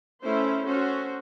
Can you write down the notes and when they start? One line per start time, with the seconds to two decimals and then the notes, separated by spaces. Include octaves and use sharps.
0.22 A3 C#4 E4 A4 C5
0.66 C#4 F#4 A4 C5